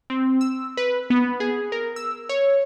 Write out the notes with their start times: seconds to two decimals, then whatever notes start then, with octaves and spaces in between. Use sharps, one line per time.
0.10 C4
0.41 E6
0.77 B4
1.10 B3
1.40 G#4
1.72 A#4
1.96 E6
2.29 C#5